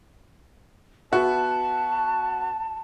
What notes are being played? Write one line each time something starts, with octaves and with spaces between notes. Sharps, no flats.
B3 F#4 E5 A5